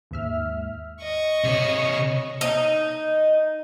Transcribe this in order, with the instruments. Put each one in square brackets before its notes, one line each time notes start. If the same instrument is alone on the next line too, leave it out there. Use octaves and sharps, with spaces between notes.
[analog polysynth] D#2 G#2 E5 F6
[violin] D#5 C#6
[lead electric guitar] C3 C#5
[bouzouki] D#4